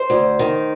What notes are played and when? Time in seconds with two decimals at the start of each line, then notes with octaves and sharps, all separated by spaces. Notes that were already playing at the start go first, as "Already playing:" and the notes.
Already playing: C5
0.10 D2
0.39 D#3